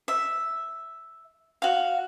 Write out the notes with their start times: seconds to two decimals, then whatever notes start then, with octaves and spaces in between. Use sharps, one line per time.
0.08 E5
1.62 F#4 F5